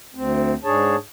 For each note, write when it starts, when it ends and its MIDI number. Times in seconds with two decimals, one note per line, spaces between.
0.15 0.54 38
0.15 0.54 60
0.64 0.96 44
0.64 0.96 62
0.64 0.96 68
0.64 0.96 73
0.64 0.96 81